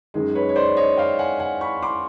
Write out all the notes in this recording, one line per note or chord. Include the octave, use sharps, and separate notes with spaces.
F#2 D#3 G#3
B4 C#5
C#5
C5 D5
C#5 D#5
F5 G5
F#5 G#5
F#5 G#5
B5 C#6
C6 D6